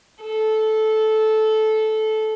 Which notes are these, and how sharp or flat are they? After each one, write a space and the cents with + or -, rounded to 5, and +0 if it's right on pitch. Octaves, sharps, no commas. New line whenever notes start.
A4 -15